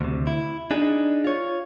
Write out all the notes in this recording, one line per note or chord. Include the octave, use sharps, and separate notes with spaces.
D2 C3
E4
D4 D#4 G#4
F4 C#5